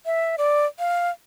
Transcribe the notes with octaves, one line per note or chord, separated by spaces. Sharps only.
E5
D5
F5